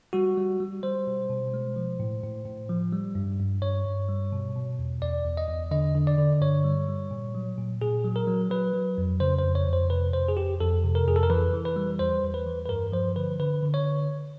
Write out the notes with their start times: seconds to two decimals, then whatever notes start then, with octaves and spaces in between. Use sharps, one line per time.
0.13 G3 F#4
0.37 G3
0.60 G3
0.83 G3 C5
1.07 B2
1.30 B2
1.54 G#3
1.76 F3
2.00 A2
2.23 A2
2.46 A2
2.69 F3
2.93 G3
3.15 G2
3.40 G2
3.62 G2 C#5
3.85 G2
4.09 G3
4.32 B2
4.56 B2
4.79 E2
5.02 E2 D5
5.25 E2
5.37 D#5
5.48 E2
5.71 D3 D#5
5.95 D3
6.07 D5
6.18 D3
6.41 G2 C#5
6.64 G3
6.89 G3
7.11 A#2
7.35 F#3
7.58 A#2
7.82 A#2 G#4
8.04 F#3
8.16 A#4
8.27 F#3
8.50 F#3 B4
8.74 F#3
8.98 F2
9.20 C#3 C5
9.39 C5
9.44 F2
9.55 C#5
9.67 F2
9.73 C5
9.90 C3 B4
10.13 F2 C5
10.28 G#4
10.37 F2 G4
10.60 F2 A4
10.84 C3
10.95 A#4
11.07 F2 G#4
11.16 A4
11.23 A#4
11.30 E3 B4
11.54 E3
11.65 B4
11.76 G3
11.99 E2 C5
12.23 E2
12.34 B4
12.46 E3
12.66 B4
12.69 G2 A#4
12.92 F3 C5
13.16 D3 B4
13.40 D3 B4
13.63 D3
13.74 C#5